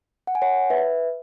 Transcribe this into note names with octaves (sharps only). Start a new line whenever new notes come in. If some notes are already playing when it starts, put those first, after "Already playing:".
F#5
G#5
C#5 F#5
B4 E5